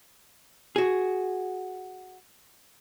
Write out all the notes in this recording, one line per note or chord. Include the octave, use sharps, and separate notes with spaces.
F#4 G#4